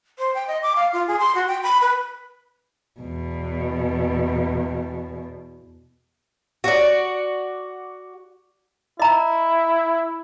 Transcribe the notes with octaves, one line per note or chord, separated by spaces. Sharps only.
C5
G5
D#5
D6
F5
F4
G#4
C6
F#4
G5
B5
B4
E2 B2
F#4 D5
E4 D#5 A#5